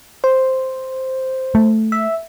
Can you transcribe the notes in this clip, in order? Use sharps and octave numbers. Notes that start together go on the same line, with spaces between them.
C5
A3
E5